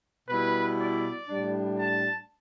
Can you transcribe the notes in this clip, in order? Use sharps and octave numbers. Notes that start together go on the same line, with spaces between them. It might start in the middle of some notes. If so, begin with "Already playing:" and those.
B2 G3 E4 B4
D5
A2 G3 D4
A5